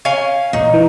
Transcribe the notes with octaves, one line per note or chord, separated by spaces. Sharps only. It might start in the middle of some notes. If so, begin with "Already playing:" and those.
C#4 F5 G#5
E2 A#2 D#4
E3